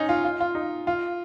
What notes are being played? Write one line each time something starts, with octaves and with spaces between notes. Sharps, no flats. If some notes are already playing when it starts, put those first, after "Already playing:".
Already playing: C#4 D#4
F4
F4
F4
D#4
F4